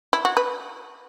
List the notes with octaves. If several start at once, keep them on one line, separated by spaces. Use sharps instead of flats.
E4
F#4
B4